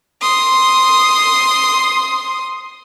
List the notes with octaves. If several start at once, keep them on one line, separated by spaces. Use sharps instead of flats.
C6 D#6